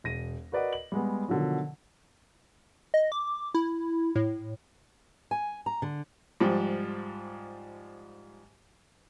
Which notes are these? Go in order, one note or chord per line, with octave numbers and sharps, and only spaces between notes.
E1 A#6 D#7
F#4 A#4 B4 D5 D#5 F#5
F#7
G3 G#3 B3
B2 D3 D#3 F3 F#3
D#5
D6
E4
A2
G#5
A#5
D3
G#2 F3 G3